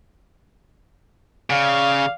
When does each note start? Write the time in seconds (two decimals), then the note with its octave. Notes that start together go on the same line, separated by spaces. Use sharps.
1.50 C#3 D5 F5